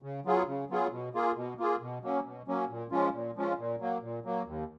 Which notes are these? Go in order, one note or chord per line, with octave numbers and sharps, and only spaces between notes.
C#3
F#3 B3 F4 G#4
C#3
F#3 B3 F4 G#4
B2
A#3 F4 G#4
B2
A#3 F4 G#4
B2
F#3 A#3 C#4
B2
F#3 A#3 C#4
A#2
F3 G#3 C#4 F4
A#2
F3 G#3 C#4 F4
A#2
F#3 A#3
A#2
F#3 A#3
D#2